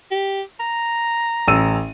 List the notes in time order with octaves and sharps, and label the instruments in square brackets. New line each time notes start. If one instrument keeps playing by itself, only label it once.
[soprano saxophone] G4
A#5
[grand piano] A1 E6 D#7